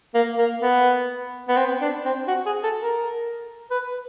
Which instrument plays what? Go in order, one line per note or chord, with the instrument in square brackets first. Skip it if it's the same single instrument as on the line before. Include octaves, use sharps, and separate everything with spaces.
[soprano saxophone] A#3
A#3
B3
B3
C4
D4
C4
F#4
G#4
A4
A#4
B4